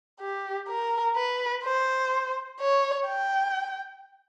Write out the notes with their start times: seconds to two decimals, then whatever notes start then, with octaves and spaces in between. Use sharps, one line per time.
0.21 G4
0.68 A#4
1.16 B4
1.64 C5
2.60 C#5
3.07 G5